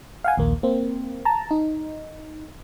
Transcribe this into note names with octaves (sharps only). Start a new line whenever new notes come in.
F5 F#5 G#5
A#1 D#2 A#3
A#3 C4
A5 A#5
D#4